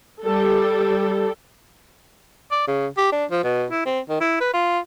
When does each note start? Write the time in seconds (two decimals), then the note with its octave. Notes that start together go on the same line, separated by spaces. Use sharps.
0.22 G3 A4
2.52 D5
2.67 C#3
2.97 G4
3.12 D4
3.31 F3
3.44 B2
3.70 E4
3.86 C4
4.09 D#3
4.20 E4
4.41 B4
4.54 F4